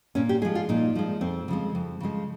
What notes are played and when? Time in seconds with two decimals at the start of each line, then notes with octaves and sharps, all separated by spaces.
0.15 A#2 C#4
0.29 G4
0.42 F3 G#3 G#4
0.55 F4
0.69 A#2 D#4
0.95 F3 G#3
1.21 F2 C4
1.48 C#3 F3 G#3
1.75 F2
2.00 C#3 F3 G#3